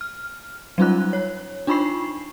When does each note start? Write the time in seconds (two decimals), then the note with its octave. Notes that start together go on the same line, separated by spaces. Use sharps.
0.01 F6
0.78 F#3 G3 C#4 D#4 F4 F#6
1.13 C#5
1.67 D4 D#4 F4 B5 C#6 C7